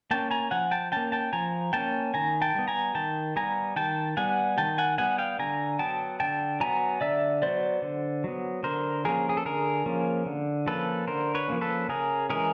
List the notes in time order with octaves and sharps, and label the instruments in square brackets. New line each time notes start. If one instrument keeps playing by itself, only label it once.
[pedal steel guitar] A#3 C#4 G5 A5
G#5 A#5
F3 F#5 G#5
G5 A5
A#3 C#4 G5 A5
G5 A5
F3 G#5 A#5
A#3 C#4 G5 A5
D#3 G#5 A#5
G5 A5
G3 B3
G#5 A#5
D#3 G5 A5
G3 B3 G#5 A#5
D#3 G5 A5
G3 B3 F#5 G#5
D#3 G5 A5
F#5 G#5
G3 B3 F#5 G#5
F5 G5
D3 G#5 A#5
F#3 B3 G5 A5
D3 G5 A5
F#3 B3 G#5 A#5
D3 D5 E5
F#3 B3 C5 D5
D3
F#3 B3
D3 A#4 C5
F3 A#3 C#4 G#4 A#4
G#4
A4
D3 G#4 A#4
F3 A#3 C#4
D3
F3 A#3 C#4 A4 B4
D3 A#4 C5
B4 C#5
F3 A#3 C#4
A4 B4
C#3 G#4 A#4
E3 G#3 C#4 G#4 A#4